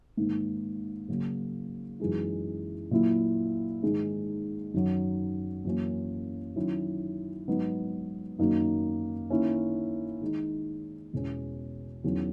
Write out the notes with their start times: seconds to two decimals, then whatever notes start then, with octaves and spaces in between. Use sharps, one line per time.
0.17 G#2 D#3 A#3
1.08 C#3 F#3 A#3
2.00 F#2 E3 G#3 D#4
2.91 A#2 F#3 A#3 E4
3.83 G#2 D#3 G#3
4.74 F#2 D#3 F#3
5.65 F#2 E3 A#3 C#4
6.56 D#3 F#3 C#4 E4
7.48 G#2 F#3 B3 D#4
8.39 F#2 D#3 A#3 D#4
9.30 D#3 A#3 C#4 E4
10.21 D#3 G#3 D#4
11.13 E2 B2 G#3 C#4
12.04 E2 D#3 F#3 C#4